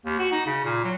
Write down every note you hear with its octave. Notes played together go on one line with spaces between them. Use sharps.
D#2
F#4
D#4
C#3
A#2
F#3